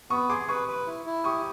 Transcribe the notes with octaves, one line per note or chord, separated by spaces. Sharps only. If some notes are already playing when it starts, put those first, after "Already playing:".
B3 C#6 D#6
G#4 C6 D6
B4 C#6 D#6
B4
E4
E4
G4 C#6 D#6